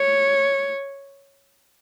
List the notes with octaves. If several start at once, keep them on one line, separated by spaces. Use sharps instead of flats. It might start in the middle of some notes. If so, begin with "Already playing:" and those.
Already playing: C#5